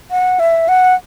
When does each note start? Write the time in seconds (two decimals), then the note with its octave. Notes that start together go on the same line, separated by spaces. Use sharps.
0.11 F#5
0.40 E5
0.68 F#5